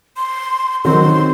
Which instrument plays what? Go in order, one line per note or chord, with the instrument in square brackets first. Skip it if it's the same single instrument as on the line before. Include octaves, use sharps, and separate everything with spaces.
[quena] C6
[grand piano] D#3 F#3 C4 [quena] C6